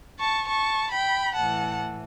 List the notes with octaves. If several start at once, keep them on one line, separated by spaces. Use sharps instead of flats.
A5 C#6
A5 C#6
G5 B5
A2 E3 F#5 A5